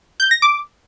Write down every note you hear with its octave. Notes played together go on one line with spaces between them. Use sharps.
G6
A#6
D6